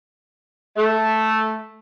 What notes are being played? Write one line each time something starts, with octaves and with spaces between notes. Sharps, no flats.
A3